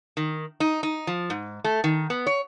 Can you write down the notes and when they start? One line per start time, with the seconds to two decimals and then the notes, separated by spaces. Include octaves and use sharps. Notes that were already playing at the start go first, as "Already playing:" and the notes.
0.17 D#3
0.60 D#4
0.83 D#4
1.07 F3
1.30 G#2
1.64 A3
1.84 D#3
2.10 B3
2.26 C#5